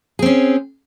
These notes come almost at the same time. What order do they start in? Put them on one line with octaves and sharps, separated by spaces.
G#4 C4 C#4